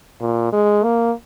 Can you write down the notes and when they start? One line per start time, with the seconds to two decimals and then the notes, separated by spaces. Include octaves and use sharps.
0.21 A#2
0.53 G#3
0.84 A#3